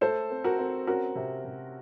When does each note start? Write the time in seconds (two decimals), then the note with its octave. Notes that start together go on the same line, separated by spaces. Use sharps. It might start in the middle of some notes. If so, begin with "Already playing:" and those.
0.01 A3 A4 C5
0.30 C4
0.44 F#4 A#4
0.58 C4
0.87 C#4 F#4 A#4
1.16 C3
1.44 C3